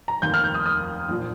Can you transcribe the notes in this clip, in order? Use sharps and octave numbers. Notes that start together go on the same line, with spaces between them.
A#5
F1 D#2 D#3 G6
F6
G6
D#6
D#6
A#1 A#2 F3